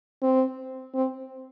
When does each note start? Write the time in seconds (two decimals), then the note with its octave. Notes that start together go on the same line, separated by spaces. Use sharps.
0.23 C4
0.94 C4